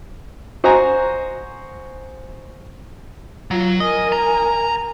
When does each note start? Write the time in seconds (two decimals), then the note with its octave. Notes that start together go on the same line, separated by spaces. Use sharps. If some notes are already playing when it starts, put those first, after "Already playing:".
0.64 F#4 C5 D#5 G#5 A#5
3.51 F#3 F4
3.80 A#4 D#5 G#5
4.12 A#5